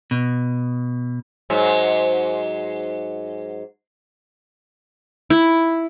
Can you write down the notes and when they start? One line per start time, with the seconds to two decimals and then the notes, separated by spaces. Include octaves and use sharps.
0.11 B2
1.50 G#2 F#3
5.30 E4